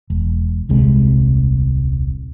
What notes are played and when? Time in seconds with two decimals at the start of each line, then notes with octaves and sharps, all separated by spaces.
0.10 E1
0.69 D#1 C2 C3 G#3